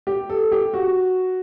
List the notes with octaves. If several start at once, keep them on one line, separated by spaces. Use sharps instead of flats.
G4
A4
G4
F#4